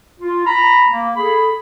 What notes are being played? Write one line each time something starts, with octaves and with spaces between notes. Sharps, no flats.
F4
A#5 B5
A#3
G#4 A4 B5